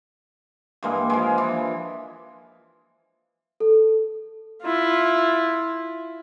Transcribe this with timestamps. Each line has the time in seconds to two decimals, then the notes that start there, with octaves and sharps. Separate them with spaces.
0.83 G2 E3 G#3 A#3
1.10 F3 G#3
1.38 E3 D4
3.60 A4
4.63 E4 F4